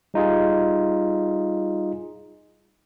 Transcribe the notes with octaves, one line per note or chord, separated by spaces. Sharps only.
G3 D#4 F4 G#4